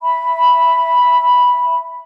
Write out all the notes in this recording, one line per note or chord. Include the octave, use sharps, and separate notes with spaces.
E5 B5